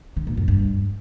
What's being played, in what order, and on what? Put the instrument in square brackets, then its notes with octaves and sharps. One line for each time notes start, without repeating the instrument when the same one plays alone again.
[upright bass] D3
A#2
F#2
G2